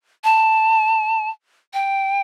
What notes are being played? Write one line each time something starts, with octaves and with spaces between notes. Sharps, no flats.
A5
G5